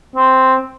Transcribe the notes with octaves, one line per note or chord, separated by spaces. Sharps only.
C4